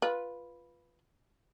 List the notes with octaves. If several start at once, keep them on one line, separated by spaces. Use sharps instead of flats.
F4 B4